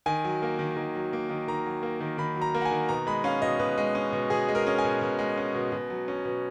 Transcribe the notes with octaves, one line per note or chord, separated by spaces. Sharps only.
D#3 G#5
F#3
A#3
D#3
D#3
F#3
A#3
D#3
D#3 A#5
F#3
A#3
D#3
D#3 B5
F#3
A#5
A#3
F#5
G#5
D#3
B2 A#5
G#3 B5
C#4 F5
B2 D#5
B2 B4
G#3
C#4
B2
B2 G#4
G#3
A#4
C#4
G#5
B2
B2
G#3
C#4
B2
B2
F#3
C#4
B2